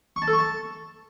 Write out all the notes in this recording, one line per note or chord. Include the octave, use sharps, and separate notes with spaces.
C#6
A5
A4
C#6
A5